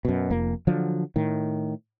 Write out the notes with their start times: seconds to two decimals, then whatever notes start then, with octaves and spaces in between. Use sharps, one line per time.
0.05 F#2 B2
0.30 F1 F2 A#3
0.67 D3 F3 F#3
1.16 A2 D#3